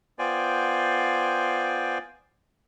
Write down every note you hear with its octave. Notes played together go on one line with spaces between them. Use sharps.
B3 F4 C5 D5 G5 G#5